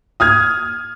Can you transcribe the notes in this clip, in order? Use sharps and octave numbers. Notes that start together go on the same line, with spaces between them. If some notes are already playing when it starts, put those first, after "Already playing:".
D#6 F6 G#6